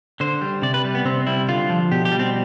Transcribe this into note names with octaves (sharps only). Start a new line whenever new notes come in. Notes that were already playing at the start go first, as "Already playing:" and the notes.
D3 C5
G3
C3 D5
B4
G3
B3
C3 C4
G3 E4
D3 F4
F3
B2 G4
G4
G3
C4